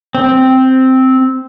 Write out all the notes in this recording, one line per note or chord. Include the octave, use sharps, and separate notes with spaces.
C4